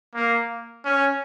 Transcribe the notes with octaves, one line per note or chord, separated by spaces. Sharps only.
A#3
C#4